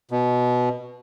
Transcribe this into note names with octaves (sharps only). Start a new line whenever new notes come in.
B2